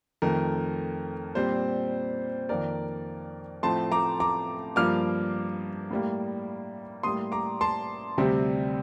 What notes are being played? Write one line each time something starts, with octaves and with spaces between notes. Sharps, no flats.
F2 D#3 A3 A#4
A#2 G3 C4 C5
F2 D#3 A#3 A#4 D5
A2 F3 A3 C4 A5 C6
A#5 D6
A#5 D6
G2 F3 A#3 D6 F6
A2 G3 A#3
A2 G3 A#3 C6 D#6
A#5 D6
A5 C6
D2 C3 G3 C4